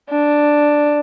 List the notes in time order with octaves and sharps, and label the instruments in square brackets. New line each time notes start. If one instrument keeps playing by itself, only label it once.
[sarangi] D4